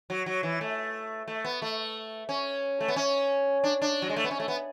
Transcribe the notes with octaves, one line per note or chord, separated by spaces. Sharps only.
F#3
F#3
E3
A3
A3
B3
A3
C#4
A3
B3
C#4
D4
D4
F#3
G#3
A3
B3
C#4
A3
B3